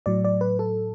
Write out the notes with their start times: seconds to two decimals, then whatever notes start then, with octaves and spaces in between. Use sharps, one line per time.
0.06 A2 F#3 D5
0.25 D5
0.41 B4
0.59 A4